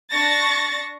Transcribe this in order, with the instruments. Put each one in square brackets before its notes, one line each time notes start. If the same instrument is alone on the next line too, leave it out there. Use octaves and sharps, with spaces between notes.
[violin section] D4 C#6 A6 A#6